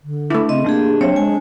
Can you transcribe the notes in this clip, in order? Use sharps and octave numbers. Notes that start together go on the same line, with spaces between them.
D3
A3 D4 E4
C#3 C4 D#5
A#3 D4 G4 G#4
F#3 C4 C#5 E5
G#3 G#5